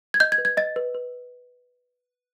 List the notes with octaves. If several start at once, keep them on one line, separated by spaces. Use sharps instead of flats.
G#6
D#5 G6
G#6
B4
G#6
D#5 A6
B4
B4